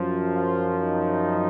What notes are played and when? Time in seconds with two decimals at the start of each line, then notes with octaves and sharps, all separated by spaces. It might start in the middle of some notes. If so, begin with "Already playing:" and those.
Already playing: F#2 F3
0.35 F4
0.82 D#4